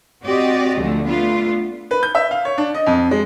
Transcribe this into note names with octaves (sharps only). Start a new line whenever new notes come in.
C4 F#4 G4 D5 D#5
D2 D3 F3 A3
A3 B3 D4 F4
B4
G6
E5
F5
C#5
D4
D#5
F2
G#3